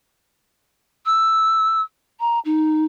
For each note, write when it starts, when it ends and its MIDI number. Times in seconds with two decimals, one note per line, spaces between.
1.06 1.81 88
2.20 2.39 82
2.45 2.84 63